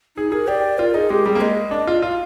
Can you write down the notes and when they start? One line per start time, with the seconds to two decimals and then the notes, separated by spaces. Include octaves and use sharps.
0.16 D#4 G#4
0.32 G#4 A#4
0.48 G4 D5
0.78 F4 A#4
0.94 D#4 G#4
1.10 G#3 G4
1.25 G3 G#4
1.35 A#3
1.40 G#3 D#5
1.71 D4
1.87 F4
2.03 F4 F5